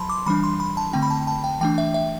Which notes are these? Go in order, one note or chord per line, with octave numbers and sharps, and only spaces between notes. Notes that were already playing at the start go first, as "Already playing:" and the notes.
Already playing: F#3 A5 B5 C6
D6
E3 G3 D4 B5
C6
B5
A5
D3 A3 C4 G5
B5
A5
A5
G5
E3 A3 D4 G5
E5
E5